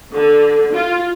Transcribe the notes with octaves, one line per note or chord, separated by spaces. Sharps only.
D3
F4